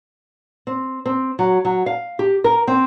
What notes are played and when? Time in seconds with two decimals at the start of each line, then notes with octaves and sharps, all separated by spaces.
0.67 C4
1.06 C4
1.39 F#3
1.65 F#3
1.86 F5
2.19 G4
2.44 A#4
2.67 C4